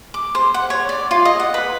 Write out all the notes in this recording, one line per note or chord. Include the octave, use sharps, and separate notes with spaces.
D6
C5
F#5
C#5
D5
F4
D#5
F#5
B4